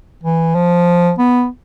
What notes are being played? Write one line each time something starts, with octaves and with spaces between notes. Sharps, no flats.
E3
F3
B3